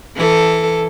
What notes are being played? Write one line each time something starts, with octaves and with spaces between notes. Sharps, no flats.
E3 A4